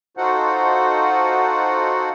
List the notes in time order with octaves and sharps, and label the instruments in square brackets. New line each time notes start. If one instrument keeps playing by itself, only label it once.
[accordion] D#4 F4 F#4 A4 C5 F#5